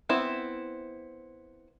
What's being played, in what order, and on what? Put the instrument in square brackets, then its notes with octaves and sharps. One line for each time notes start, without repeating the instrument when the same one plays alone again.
[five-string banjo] B3 C4 E4